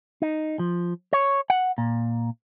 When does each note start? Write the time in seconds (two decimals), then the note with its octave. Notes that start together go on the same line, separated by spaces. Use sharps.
0.22 D#4
0.59 F3
1.13 C#5
1.50 F#5
1.78 A#2